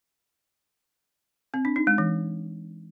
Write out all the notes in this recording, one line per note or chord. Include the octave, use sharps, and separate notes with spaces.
C4
D4
D#4
G#3
E3